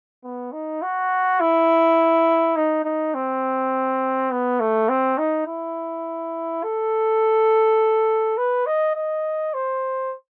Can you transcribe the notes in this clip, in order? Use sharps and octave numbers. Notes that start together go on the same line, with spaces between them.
B3
D#4
F#4
E4
D#4
D#4
C4
B3
A3
C4
D#4
E4
A4
B4
D#5
D#5
C5